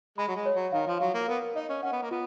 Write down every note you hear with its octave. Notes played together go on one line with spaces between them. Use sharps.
G#3 B5
F#3
G#3
C#5
F#3
D#3 F5
F3
F#3 F5
A#3
B3 A#4
D#4 D#5
C#4
C#4 F#5
B3
A#3
B3 F4